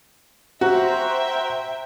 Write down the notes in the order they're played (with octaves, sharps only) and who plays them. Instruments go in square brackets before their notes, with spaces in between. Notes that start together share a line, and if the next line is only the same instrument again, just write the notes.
[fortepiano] F#4 [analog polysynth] C5 A#5 [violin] E5 G5